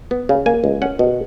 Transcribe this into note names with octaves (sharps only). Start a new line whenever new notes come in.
B3
C#3
A#3 G#5
C#2
C#4 F#5
B2